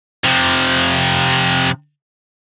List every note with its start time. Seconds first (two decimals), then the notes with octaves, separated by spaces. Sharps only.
0.24 C3 F3